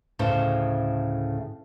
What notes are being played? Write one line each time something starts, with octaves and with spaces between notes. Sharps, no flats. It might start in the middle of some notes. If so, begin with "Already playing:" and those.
D2 A2 C#3 C5 A5